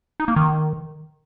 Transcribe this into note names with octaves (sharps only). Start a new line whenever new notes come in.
D#4
A#3
D#3